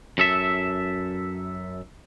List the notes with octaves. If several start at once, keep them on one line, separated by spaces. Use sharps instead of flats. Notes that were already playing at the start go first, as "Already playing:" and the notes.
F#2 A4 E5